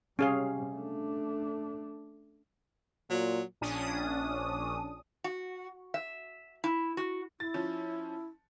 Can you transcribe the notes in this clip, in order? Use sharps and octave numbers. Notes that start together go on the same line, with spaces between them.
C3 G3 C#4 G#4 F5
A3 D4
A#2 F#3
A#1 C#4 D4 D#6
F#4
E5
E4
F#4
E4 A6
F3 C#4